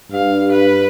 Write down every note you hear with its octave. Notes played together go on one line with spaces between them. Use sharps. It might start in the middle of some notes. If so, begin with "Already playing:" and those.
G2 F5
B4